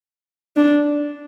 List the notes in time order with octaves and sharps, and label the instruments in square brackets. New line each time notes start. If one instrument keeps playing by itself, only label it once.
[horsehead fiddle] D4